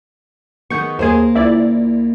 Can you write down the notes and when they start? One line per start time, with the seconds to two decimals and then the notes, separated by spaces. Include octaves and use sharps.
0.70 D#3 G#3 B3 C#6 G6
0.99 D#2 A#3 G#4 C5
1.35 C#2 E4 D5